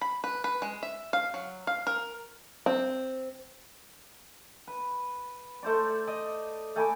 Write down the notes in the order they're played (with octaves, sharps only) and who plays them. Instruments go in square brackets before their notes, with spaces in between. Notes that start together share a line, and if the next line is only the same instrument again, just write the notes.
[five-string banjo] B5
B4
B4
G#3
E5
F5
F#3
F5
A#4
C4
[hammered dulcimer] B4
A3 C5 D5
D5 D#5
A3 G#5 B5 D6